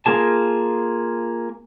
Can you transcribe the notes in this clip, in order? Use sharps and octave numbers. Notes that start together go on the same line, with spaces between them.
A#3 F4 G#4 A5